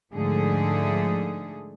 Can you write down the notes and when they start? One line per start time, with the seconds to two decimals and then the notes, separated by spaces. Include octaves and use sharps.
0.13 G#2 D3 F3 A3 G#4